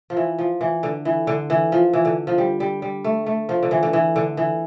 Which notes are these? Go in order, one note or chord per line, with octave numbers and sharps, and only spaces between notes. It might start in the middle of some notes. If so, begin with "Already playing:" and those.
F3
E3
F3
E3
D3
E3
D3
E3
F3
E3
D3
F3
G3
G3
G3
A3
A3
F3
D3
E3
D3
E3
D3
E3